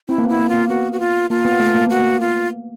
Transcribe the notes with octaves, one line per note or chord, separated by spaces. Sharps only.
C4 E4
A#3
B3 E4
A#3
A#3 F4
B3 F#4
F#4
F4
A#3 F4
B3
A3
A#3
B3 F#4
A#3
F4